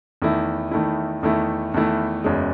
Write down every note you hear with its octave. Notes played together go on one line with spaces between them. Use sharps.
E2 D#3 A3 E4
E2 D#3 A3 E4
E2 D#3 A3 E4
E2 D#3 A3 E4
F#1 E2 C#3 G#3